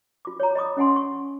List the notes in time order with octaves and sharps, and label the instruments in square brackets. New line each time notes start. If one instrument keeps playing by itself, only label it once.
[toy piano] F4 D6
C#5 A#5
D#5 B5 D6 D#6
C#4 D#5 F#5 G#5 C6
C#6